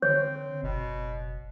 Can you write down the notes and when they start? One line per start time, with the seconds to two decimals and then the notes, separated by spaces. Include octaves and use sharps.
0.02 D3 C4 C#5
0.63 F#1 B2